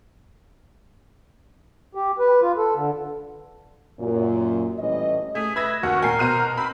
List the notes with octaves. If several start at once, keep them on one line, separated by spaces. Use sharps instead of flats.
G4
B4
F4
A4
D3
F#2 A#2
A2 E3 G3 C#4 D#5
A3 G#4
B4 E5 G#6 A#6
D#2 C#4 F#4 F#5
A#2 A#4 G5 G#5 C7
B2 F#4 C5 A#5 F6 D#7
C4 B5